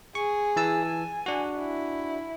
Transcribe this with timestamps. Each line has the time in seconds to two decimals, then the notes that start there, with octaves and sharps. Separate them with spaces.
0.15 G#4 C#6
0.56 E3 A5 E6
0.86 G#5
1.26 D4 F#4
1.59 E4